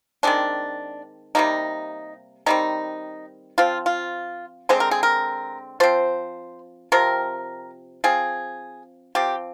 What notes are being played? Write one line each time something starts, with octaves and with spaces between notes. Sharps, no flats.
D#3 G#3 C4 D4
C3 G3 A#3 D#4
D#3 G3 C4 D#4
F3 C4 F4
F4
D3 G#3 C4 C5
A#4
G#4
A#4
F3 C4 C5
C3 F3 C4 A#4
F3 C4 G#4
F3 C4 G4